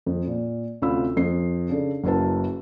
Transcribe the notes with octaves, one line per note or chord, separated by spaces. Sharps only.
F2
A#2
D2 C3 C#4 F4 B5 E6
F2 C7
C#3 D4 A4
F#1 F#3 E4 A#4 B4 A5